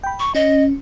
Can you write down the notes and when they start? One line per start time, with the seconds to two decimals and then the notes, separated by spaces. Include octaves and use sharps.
0.04 G5 B5
0.20 C#6
0.35 C#4 D#5